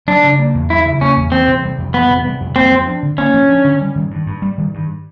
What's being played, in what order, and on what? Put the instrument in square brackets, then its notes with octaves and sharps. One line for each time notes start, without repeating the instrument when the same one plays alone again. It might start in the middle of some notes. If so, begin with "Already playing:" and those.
[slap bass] F#3 [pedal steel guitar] D4
[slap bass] C#3
A#3
E2
[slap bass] F#3 [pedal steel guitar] E4
[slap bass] C#3
[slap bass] A#3 [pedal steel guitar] C#4
[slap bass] E2
[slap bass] E3 [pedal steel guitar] C4
[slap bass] C3
G3
F2
[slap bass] E3 [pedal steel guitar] B3
[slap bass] C3
G3
F2
[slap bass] A#3 [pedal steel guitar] C4
[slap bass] F3
D4
D3
[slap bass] A#3 [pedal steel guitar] C#4
[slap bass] F3
D4
D3
G3
D#3
G2
G2
G3
D#3
G2